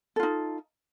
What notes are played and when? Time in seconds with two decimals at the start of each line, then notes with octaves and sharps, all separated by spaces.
0.16 A4
0.20 F4
0.23 D#4